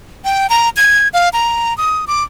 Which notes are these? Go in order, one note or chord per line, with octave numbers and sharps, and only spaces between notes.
G5
A#5
G#6
F5
A#5
D#6
D6